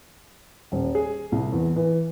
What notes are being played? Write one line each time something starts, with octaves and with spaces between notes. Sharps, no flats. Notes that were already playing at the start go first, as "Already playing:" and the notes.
D#1
G#4
C2
E2
E3